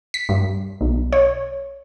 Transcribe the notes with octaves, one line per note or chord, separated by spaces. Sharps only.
B6
G2
B1
C#5